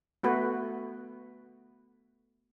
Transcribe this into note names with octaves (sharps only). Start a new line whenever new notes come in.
A3 B3 F#4 B4